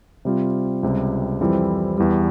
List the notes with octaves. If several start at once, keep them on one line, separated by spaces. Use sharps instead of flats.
C3 G3 C4 F4
C#2 C3 G3
F2 E3 G3 C4 E4
E2 E3 G3